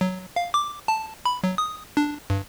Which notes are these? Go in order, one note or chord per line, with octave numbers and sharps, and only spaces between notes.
F#3
F5
D6
A5
B5
F#3
D#6
D4
G2